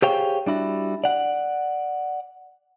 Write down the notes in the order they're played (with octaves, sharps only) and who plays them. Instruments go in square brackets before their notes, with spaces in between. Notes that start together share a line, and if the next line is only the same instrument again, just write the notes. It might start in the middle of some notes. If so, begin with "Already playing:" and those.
[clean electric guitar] G4 G#4 C5 C#5 F5 G5
G3 D4 E4 F#4
D5 F#5